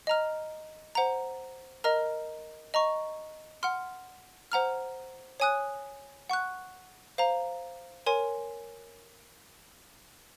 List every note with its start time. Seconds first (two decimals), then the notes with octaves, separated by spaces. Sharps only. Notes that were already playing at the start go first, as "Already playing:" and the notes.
0.07 D#5 A#5 F6
0.95 C5 F#5 A#5
1.84 A#4 D#5 A#5 F6
2.74 D#5 A#5 C#6
3.63 F#5 C6 F6
4.52 C5 F#5 A#5 F6
5.40 C#5 G#5 D#6 F#6
6.29 F#5 C#6 F#6
7.18 C5 F5 A#5
8.06 A#4 C#5 G#5 C6